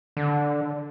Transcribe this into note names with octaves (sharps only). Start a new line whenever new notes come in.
D3